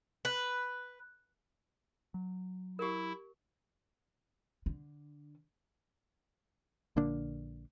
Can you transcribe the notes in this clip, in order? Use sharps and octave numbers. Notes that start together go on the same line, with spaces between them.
B4
F#3
E4 G4 A#4
D3
A#1 D3 A#3 D4